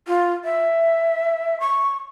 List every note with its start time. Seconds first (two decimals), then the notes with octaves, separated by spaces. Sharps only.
0.08 F4
0.44 E5
1.60 C#6